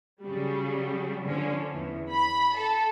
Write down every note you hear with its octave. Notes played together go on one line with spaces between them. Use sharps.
C#3 F#3 G3
D3 F3 C#4
E2
B5
A4